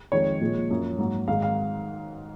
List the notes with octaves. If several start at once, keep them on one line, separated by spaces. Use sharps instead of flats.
F2 D#3 G#3 C#5
A#2 F3 G#3
F#2 F3 A#3
G#2 F#3 A#3
G#2 D#3 G#3 F5
F5